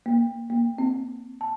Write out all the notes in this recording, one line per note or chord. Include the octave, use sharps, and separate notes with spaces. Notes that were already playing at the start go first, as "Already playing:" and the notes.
A#3
A#3
C4
A5